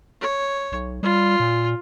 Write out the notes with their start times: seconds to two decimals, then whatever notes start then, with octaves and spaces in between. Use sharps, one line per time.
0.21 C#5
0.72 B1
1.03 G3 F4
1.40 A#2